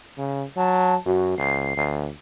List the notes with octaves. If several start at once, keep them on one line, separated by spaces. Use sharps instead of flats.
C#3
F#3 A5
F#2 F#4
C#2 C7
D2